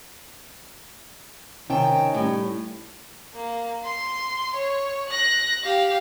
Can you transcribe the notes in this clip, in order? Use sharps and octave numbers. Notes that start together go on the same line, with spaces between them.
C3 D#3 C#4 D#4 G5 A5
A2 G3
A#3
C6
C#5
F#6 A#6
G4 F5